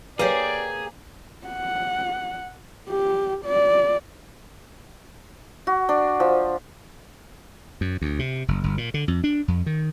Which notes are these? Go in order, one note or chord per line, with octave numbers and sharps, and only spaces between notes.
A#3 G4 G#4 B4 C#5 D5
F#5
G4
D5
F#4
D4
F3
F#2
D2
C3
F#1
G1
A#2
D3
F2
D4
F2
D#3